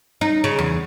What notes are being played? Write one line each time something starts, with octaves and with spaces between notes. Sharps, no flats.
D#4
C#3
E2